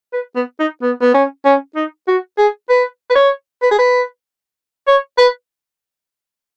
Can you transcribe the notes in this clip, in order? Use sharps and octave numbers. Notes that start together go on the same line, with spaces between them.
B4
B3
D#4
B3
B3
C#4
C#4
D#4
F#4
G#4
B4
B4
C#5
B4
G#4
B4
C#5
B4